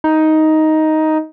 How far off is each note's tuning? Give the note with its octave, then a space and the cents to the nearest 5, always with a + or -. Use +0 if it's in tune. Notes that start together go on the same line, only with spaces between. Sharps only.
D#4 +10